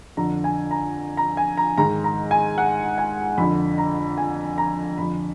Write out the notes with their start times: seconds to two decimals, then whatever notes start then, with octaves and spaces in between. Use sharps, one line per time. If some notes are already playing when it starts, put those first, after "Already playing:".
0.17 F2 D3 A#5
0.44 G#5
0.71 A#5
1.17 A#5
1.37 G#5
1.57 A#5
1.78 G#2 D#3 A#5
2.04 A#5
2.31 G#5
2.58 F#5
2.98 G#5
3.38 F2 D3 B5
3.78 A#5
4.18 G#5
4.58 A#5
4.98 F2 D3 B5